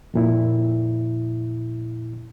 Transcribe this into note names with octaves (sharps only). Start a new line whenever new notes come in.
F2 A#2 E4